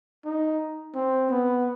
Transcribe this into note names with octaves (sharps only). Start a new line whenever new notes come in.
D#4
C4
B3